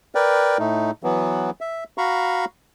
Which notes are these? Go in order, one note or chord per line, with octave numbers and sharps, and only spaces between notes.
A#4 B4 D5 G5
A2 A3 D#4
E3 F#3 B3
E5
F#4 F5 A#5 B5 C#6